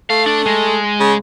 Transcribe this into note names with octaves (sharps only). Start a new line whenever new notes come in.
A3 F5
D4
G#3
C#3